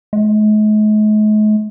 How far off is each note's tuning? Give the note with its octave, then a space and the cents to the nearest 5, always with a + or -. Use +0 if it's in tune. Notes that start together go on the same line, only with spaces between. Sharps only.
G#3 +45